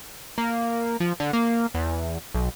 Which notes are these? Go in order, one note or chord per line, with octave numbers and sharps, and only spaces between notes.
A#3
F3
D3
A#3
E2
B1